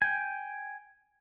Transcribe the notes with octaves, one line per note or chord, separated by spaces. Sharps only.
G5 G#5